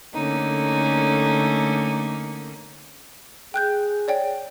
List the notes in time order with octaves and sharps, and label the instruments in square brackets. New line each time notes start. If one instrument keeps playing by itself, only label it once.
[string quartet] D3 A3 A#3 C#4 D#4
[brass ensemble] G#4 [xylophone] G5 F#6 G6
[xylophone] C#5 D5 G5